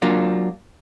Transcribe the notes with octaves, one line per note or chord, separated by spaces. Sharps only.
F#3 A#3 D4 F4